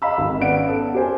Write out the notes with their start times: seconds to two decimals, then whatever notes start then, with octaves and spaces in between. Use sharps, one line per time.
0.02 D#5 F5 B5 E6
0.18 G#1
0.40 B3 C#4 D5 F5 F#5 D7
0.68 A4
0.94 G4 A#4 C5 G#5